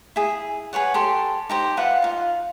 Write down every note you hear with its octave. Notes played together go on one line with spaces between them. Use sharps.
E4 G#4
G#4 B4 C#5 F#5
G4 A4 C6
D#4 G4 C5
F4 B4 E5 F#5
D#4 F4